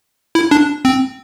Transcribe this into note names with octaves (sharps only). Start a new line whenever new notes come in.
E4
D4
C4